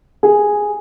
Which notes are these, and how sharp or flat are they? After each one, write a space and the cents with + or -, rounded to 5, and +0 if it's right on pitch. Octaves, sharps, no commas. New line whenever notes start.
G#4 -5